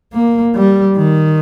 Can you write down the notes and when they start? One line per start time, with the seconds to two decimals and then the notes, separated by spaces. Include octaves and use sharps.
0.13 A#3
0.55 G3
0.97 D#3